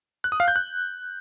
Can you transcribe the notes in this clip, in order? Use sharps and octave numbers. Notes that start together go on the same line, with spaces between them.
F#6
D#6
F5
G6
F#6